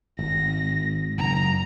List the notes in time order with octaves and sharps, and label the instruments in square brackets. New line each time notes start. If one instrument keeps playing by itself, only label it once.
[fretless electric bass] G#1 [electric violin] A#6
[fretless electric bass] F#1 [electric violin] A#5